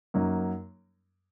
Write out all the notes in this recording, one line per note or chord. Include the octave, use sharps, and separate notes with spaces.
F#2 F#3 A#3 D#4